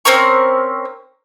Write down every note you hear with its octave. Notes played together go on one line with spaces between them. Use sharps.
C4 C#4 A#4 C#6